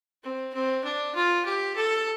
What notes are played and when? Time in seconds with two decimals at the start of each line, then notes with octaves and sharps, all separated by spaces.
0.23 C4
0.54 C4
0.84 D4
1.15 F4
1.45 G4
1.75 A4